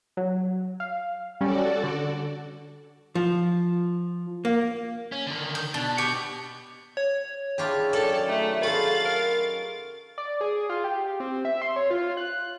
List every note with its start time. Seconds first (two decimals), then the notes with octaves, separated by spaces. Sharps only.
0.17 F#3
0.80 F5
1.41 G3 C#4 F#4 A4 D5
1.84 D3
3.15 F3
4.45 A#3
5.12 C#4
5.27 D3 D#3
5.55 G6
5.74 B2 D4
5.98 G4 C#6 G6
6.97 C#5
7.58 C#3 C#4 D4 E4 F4 G4
7.93 F#2 D#3 A4 D5 G5 A5
8.28 A3 D#4
8.63 F4 F#4 G#4 A4 F5 B5 C6 A6
9.05 A#4
10.18 D5
10.41 G#4
10.69 F4
10.84 G4
11.20 C4
11.45 E5
11.62 C6
11.76 C#5
11.90 F4
12.17 F#6